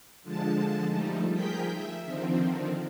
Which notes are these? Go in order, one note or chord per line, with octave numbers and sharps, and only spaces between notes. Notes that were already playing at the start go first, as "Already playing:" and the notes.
D3 F3 G#3 A5
F3 G3 A3 D#4
F3 G#4 A#4 G5 G6 B6
E5
D3 D#3 F3 C4